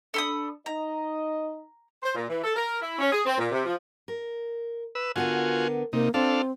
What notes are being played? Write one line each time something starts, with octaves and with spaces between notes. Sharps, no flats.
D4 A4 B5 D#6
D#4 D#5 A#5
C5
A#2
E3
A4
A#4
E4
C#4
G#4
C4
A#2
C3
F3
A#4
B4 E6
D3 B3 F4 F#4 A#4 G#5
C3 A#3 D#4
C4 D4 F4 A4 F5